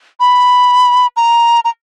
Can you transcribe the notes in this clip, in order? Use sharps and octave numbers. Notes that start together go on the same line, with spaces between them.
B5
A#5
A#5